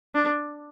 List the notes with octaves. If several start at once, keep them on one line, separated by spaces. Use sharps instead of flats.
D4